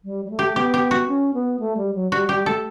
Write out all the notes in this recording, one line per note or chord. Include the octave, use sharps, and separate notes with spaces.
G3
G3
A3
G4
B3 G4
G4
F#4
C#4
B3
A3
G3
F#3
G3 F#4
G3 G4
A3 A4